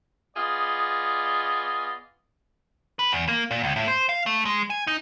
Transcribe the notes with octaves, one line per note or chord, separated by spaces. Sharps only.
B3 F4 G#4 D5 D#5
B4
E2
A#3
A#2
C#2
A2
C5
F5
A3
G#3
G#5
D#4